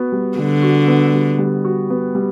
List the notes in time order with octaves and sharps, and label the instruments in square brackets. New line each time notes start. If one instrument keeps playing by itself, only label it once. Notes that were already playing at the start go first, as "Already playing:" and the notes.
Already playing: [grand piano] B3 F#4
G3
[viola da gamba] D3 [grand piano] G3
[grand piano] F#4
B3
G3
G3
F#4
B3
G3